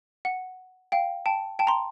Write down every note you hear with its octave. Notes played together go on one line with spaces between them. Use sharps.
F#5
F5 G5
G5 A5
G5 A5
A#5 C6